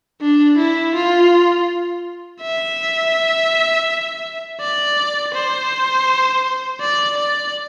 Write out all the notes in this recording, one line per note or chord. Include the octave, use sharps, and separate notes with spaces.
D4
E4
F4
E5
D5
C5
D5
D5